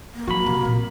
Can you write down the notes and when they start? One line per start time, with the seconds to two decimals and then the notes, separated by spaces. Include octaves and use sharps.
0.15 A#3
0.28 F3 F#3 F#4 B5
0.46 C3
0.65 A#2 C4